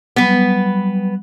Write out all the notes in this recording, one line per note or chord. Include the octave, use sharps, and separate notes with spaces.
F#3 G3 B3 B4